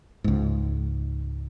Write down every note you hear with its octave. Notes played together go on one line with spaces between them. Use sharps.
C#2 G#2